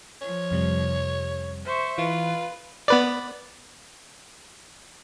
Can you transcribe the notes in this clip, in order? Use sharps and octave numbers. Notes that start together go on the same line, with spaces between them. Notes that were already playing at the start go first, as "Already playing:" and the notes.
F3 C#5
F2 C3 G3
C5 E5 C#6
E3 F4 B4
B3 B4 D5